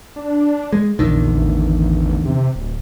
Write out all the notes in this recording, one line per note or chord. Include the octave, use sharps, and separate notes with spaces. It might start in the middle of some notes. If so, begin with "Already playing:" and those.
D4
G#3
A#1 E2 D3 D#3
A1
C3
D1